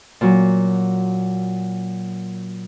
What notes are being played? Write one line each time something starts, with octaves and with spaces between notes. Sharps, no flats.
A#2 F#3